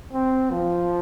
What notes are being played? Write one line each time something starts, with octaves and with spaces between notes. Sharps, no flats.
C4
F3